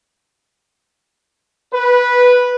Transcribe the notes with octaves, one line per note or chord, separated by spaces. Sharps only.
B4